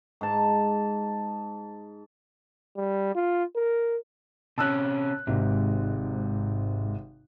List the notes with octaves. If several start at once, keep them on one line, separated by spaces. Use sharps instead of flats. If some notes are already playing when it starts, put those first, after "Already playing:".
G#2 A5
G3
F4
A#4
C3 C#4 A5 E6 F#6
G#1 G#2 C3